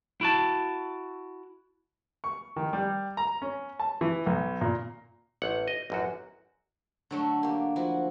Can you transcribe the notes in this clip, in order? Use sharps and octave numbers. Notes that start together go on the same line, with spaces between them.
E4 F#4 A5
C#6
D#3
G3
A#5
C#4
A5
E3
B1
A#2
A1 F#5
D#5
A1 F#2 F#4
D3 F#3 A3
A#3 G4
F3 E4 F#4